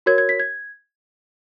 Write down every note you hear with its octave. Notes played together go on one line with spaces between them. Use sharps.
F#4 A#4 C#5 G#6
G#6
B6
G#6